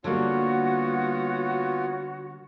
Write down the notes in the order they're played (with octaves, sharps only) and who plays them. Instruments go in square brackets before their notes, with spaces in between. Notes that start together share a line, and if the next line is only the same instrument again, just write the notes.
[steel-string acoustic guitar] D3 G3 A#3 [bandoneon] B3 F4 C#5 [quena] F#4